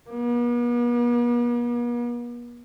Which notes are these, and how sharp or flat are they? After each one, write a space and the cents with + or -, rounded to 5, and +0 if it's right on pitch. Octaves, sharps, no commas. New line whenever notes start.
B3 -45